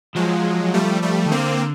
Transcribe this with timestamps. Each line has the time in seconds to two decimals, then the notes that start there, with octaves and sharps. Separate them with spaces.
0.16 F3 F#3 G#3
0.74 G3 A3
1.02 G3 A3
1.26 D#3
1.32 D3 A#3 C4